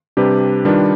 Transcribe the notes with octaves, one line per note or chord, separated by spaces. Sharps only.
C3 G3 D4 G4 B4
D#3 G3 D4 F4 B4